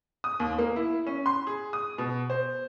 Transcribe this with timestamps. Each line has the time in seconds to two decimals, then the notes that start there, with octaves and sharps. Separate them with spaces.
0.24 D#6
0.40 D#2
0.58 A#3
0.76 E4
1.07 C#4
1.26 C6
1.47 G#4
1.73 D#6
1.98 B2
2.30 C5